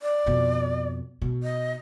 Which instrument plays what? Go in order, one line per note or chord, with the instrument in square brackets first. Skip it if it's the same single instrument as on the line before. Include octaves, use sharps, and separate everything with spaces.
[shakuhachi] D5
[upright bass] F2 B2
B2
[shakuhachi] D#5